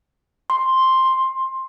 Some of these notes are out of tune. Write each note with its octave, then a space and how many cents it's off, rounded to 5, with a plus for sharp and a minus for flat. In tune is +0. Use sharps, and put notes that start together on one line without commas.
C6 +5
C6 +15